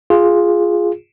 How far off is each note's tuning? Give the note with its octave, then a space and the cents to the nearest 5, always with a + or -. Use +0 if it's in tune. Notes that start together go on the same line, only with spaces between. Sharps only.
F4 +0 G#4 -5